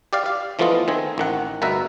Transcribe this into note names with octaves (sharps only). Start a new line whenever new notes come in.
G4 D5 F5
F5
E3 F3 A3 B3 F4 D#5
D#3 C4 G#5
A1 D#3 F#5
G1 B2 A#4 B4 E5